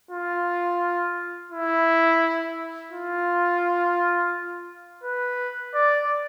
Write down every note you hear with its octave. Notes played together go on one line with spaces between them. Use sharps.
F4
E4
F4
B4
D5